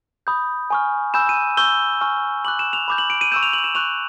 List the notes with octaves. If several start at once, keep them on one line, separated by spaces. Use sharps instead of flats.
B5 D#6 G6
G#5 C#6 F6
G#5 B5 E6 G6 E7
D#7
C#6 E6 G6 G7
G#5 C#6 F6
B5 D6 F#6 F#7
E7
F7
B5 D6 G6
F#7
D7
D#7
C#6 E6 G6 E7
F7
F#7
E7
C#6 F#6 F7